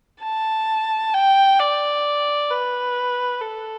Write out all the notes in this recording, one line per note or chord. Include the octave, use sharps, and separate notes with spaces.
A5
G5
D5
B4
A4